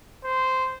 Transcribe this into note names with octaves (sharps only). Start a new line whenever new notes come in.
C5